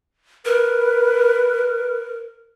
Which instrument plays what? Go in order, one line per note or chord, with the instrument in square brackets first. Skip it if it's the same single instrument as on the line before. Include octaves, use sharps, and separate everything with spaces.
[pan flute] A#4 [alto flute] B4